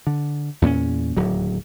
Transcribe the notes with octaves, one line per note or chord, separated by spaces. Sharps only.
D3
E2 A#2 A#3 C#4
D1 D#2 F#3